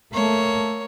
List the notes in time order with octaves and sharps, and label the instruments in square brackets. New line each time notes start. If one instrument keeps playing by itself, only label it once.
[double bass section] A3 [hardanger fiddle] A#3 C#5